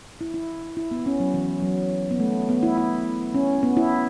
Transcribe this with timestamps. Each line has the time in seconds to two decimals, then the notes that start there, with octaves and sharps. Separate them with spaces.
0.21 E4
0.34 E4
0.77 E4
0.91 B3
1.06 C#4
1.20 F#3
1.34 E3
1.62 F#3
2.11 B3
2.20 A3
2.49 B3
2.63 E4
2.77 E4
3.34 C#4
3.63 B3
3.77 E4